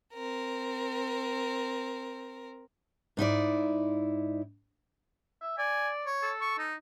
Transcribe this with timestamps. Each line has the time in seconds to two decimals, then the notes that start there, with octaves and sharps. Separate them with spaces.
0.14 C4 A#4
3.17 G#2 D#4 E4 D5
5.41 E5
5.58 D5 G#5
6.06 C#5
6.22 A4
6.41 C#6
6.58 D#4